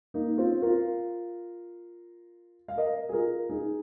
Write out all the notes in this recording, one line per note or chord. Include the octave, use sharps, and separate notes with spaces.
A#3 D#4
C4 F4
F4 A#4
F5
A#4 D#5
G#4
F4 A#4
D#4 G#4